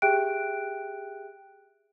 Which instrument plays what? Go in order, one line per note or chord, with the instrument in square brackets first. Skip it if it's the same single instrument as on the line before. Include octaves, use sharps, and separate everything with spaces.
[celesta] G4 G#4 E5 G5 F#6 D7